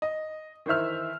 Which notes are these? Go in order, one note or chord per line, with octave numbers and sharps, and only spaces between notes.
D#5
D#3 E3 C5 E5 F6